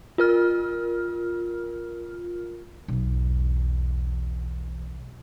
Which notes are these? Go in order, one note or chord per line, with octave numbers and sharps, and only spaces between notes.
F4 A#4 F6
B1 E2